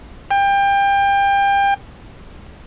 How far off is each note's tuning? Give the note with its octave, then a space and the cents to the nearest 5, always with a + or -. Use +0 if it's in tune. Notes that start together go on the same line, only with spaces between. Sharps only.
G5 +25